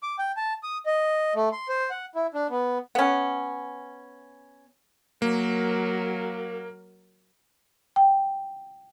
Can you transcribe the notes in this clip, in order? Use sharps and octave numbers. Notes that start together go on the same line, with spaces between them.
D6
G5
A5
D#6
D#5
A3
C6
C5
F#5
E4
D4
B3
B3 C#4
F#3 A#3 A#4
G5